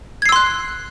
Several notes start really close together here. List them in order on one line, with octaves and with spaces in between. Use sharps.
G#6 C7 E6 C6 F#6